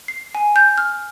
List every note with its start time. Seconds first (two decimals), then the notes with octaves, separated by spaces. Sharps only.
0.08 C7
0.35 G#5
0.56 G6
0.78 F6